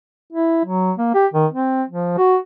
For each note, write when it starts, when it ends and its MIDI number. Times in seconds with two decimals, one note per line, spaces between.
0.32 0.64 64
0.65 0.92 54
0.98 1.10 58
1.14 1.26 67
1.33 1.47 51
1.52 1.83 60
1.89 2.17 53
2.18 2.37 66